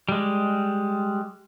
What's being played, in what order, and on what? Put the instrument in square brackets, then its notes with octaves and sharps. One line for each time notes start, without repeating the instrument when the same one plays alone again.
[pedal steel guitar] G3 G#3